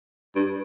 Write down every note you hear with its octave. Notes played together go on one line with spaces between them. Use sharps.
G2